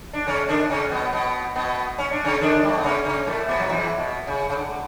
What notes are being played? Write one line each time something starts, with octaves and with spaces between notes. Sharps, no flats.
D4
C#3 C#4
D3 D4
C#3 C#4
B2 B3
B2 B3
B2 B3
C#4
D4
C#3 C#4
D3 D4
G3
A3
B3
C#3 C#4
C#3 C#4
A2 A3
B2 B3
F#3
E2 E3
B2
C#3
C#3
D3